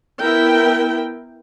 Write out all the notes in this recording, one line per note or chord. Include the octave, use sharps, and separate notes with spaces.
B3 E4 A#4 G5